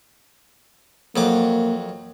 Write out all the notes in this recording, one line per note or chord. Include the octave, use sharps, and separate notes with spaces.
F2 F#3 A#3 D6